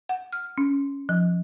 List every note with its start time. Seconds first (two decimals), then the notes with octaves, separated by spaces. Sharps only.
0.09 F#5
0.33 F6
0.58 C#4
1.09 F3